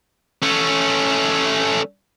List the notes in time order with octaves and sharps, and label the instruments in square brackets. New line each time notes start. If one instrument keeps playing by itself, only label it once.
[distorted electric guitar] A3 C#4